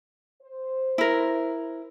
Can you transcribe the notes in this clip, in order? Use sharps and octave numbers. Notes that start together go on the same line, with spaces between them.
C5
E4 A#4